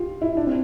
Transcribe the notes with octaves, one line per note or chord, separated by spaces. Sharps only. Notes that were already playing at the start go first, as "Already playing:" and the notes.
Already playing: F4 G4
E4
D4
C4